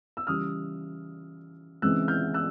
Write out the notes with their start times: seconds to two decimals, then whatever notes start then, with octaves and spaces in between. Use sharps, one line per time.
0.17 E6
0.27 C#3 E3 G3 D#6 F6
1.82 C#3 E3 G#3 C4 E6 F#6
2.08 F6 G6
2.34 E6 F#6